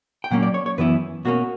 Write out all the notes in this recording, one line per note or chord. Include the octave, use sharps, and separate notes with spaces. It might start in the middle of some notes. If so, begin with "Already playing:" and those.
G5
A#2 F#3 A#3 C#4 F#5
D5
C#5
C#5
F#2 E3 B3 E4 B4
B2 A#3 C#4 F#4